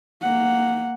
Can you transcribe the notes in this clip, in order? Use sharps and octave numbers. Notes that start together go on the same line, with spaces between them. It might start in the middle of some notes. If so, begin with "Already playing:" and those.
A#3 F#5